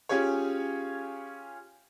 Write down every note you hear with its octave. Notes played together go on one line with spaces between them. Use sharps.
C#4 F4 G4 G#4 C#5